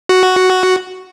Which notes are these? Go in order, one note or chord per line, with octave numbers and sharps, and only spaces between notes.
F#4